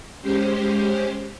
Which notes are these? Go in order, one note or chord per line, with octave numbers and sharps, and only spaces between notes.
G#3 C#4 G4 C5